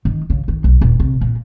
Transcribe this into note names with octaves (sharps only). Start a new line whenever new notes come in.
D#3
C#3
D#3
B1
D#1
C3
A#2